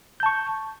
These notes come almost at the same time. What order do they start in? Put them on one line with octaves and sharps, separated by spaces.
G6 A5 C#6